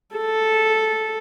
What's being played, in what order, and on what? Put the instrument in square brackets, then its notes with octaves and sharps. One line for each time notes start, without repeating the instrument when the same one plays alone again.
[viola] A4